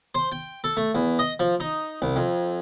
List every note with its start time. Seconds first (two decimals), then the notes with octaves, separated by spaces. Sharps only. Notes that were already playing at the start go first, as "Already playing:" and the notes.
0.15 C5
0.32 G5
0.64 A4
0.77 A3
0.95 E2
1.19 D#5
1.40 F3
1.60 D#4
2.02 C2
2.16 F2